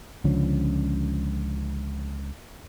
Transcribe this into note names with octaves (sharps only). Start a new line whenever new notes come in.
C#2 D3 F3 C#4